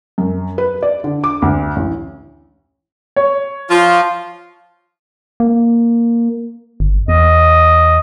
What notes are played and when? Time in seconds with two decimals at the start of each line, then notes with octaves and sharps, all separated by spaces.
0.18 F#2
0.58 B4
0.83 D5
1.04 D3
1.24 D6
1.42 D2
1.76 A1
3.16 C#5
3.70 F3 F4
5.40 A#3
6.80 G1
7.08 E2 D#5